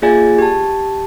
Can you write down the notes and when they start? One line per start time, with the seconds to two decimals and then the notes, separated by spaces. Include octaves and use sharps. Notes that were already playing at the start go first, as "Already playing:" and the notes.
0.02 A#3 F4 G#4 D5 G#5 A6
0.39 G4 A5